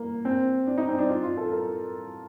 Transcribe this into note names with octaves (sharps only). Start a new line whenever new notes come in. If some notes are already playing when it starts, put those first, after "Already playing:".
Already playing: A#3
C4
D4
D#4
C4
D4
F4
F4
A4
A#4